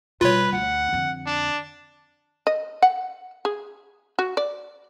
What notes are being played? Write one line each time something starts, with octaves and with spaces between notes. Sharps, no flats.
B2 G3 F4 B4 C#5
D2 F#5
F2 D3
D4
D#5
F#5
G#4
F#4
D5